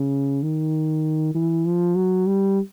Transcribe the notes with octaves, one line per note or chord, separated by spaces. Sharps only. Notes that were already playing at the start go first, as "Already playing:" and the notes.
Already playing: C#3
D#3
E3
F3
F#3
G3